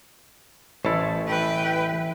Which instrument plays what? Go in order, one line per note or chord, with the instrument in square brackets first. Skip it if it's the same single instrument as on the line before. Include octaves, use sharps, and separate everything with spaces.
[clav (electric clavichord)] A1 E4 [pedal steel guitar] C5 C#5 A5
[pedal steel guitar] E3 [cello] B4 G5